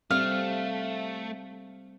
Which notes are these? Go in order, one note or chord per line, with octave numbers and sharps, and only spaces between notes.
G3 A3 C4 F5